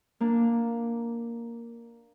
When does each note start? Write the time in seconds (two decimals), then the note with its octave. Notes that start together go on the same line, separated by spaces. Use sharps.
0.20 A#3 D4